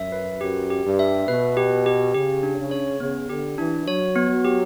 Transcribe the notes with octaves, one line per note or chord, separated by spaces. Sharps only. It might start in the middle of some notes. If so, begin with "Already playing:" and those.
Already playing: F#2 E5
B4
F#2 G4
G4
G2
E5
B2 B4
G4
G4
C#3 G4
D4
C#3
C#5
C#3 B3
D3 G4
E3 D4
F#3 C#5
B3
F#3
G4